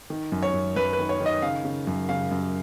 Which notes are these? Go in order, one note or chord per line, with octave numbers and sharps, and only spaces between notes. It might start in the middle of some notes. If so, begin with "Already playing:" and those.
D#3
F#2
C#5
F#2
F#2 B4
B4
D#3
C#5
D#3
D#5
C#3 F5
C#3
F#2
C#3 F5
F#2